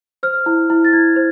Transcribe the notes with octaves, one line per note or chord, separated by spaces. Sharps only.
C5 F6
E4
E4
A6
E4 G#6
C5